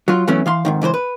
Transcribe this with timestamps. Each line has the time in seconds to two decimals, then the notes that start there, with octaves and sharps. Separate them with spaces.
0.08 F#3 F4
0.27 E3 F#3 A3 B3 C#4 E4
0.46 E3 F5 C6
0.65 F2 G#2 D#3
0.82 C#2 E3 B4 C5
0.94 B4